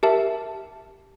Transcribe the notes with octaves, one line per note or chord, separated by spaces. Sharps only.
G4 A#4 E5 A5